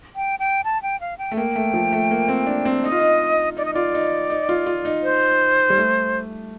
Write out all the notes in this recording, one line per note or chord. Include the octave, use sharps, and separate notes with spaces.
G5
G5
A5
G5
F5
G5
A3
A#3 G5
A3
F3
A3
A#3
C4
D4
C4
D#4 D#5
F4
D#4
D#4 D5
D#5
F4 D5
D#4
D#4
F4
F4
D#4
C5
G3
A3